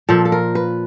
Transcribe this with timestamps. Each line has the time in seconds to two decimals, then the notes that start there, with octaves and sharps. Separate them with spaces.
0.09 A#2 F3 A4
0.25 A4
0.32 A#4
0.55 B4